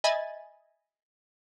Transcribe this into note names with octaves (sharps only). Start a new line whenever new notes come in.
D#5 E5 G#5 B5 G#6 A6